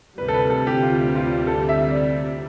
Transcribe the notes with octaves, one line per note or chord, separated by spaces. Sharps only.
D2 C3 G3 B4
A4
B4
A4
G4
F4
F4
A4
E5
D5